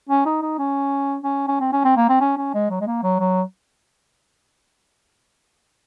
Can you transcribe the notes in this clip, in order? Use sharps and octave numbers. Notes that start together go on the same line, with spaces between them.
C#4
D#4
D#4
C#4
C#4
C#4
C4
C#4
C4
A#3
C4
C#4
C#4
G#3
F#3
G#3
A#3
F#3
F#3